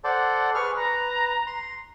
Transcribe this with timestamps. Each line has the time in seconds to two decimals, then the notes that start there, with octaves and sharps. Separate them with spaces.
0.04 A4 C5 D5 F#5
0.55 G#4 B4 C#6 F6
0.76 B4 A#5
1.47 C6